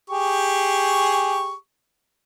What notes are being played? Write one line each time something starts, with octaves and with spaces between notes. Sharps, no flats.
G4 G#4 C#6